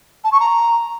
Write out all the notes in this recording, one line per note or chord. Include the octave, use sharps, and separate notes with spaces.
A5
C#6
A#5